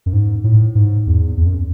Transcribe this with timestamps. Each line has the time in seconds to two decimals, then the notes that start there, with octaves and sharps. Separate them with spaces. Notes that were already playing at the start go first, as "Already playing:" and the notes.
0.06 F#2
0.13 G#2
0.44 A2
0.75 G#2
1.07 E2
1.37 E2
1.46 F#2